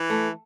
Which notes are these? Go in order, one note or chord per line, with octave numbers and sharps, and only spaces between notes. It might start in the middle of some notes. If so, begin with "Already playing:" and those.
Already playing: E3
A3